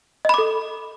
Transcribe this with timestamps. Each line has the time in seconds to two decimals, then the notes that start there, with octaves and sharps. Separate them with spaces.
0.25 D#5
0.29 B5
0.34 D6
0.38 A4